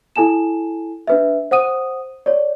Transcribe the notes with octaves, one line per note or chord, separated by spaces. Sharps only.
E4 A4 G#5 A5 E7
D4 B4 E5
C5 F#5 D#6 D#7
C#5 D5